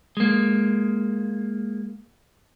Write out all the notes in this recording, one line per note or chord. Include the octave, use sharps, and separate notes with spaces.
G#3 A#3